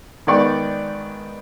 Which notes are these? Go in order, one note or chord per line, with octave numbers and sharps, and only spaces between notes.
G#2 D#3 B3 D5 G5 C#6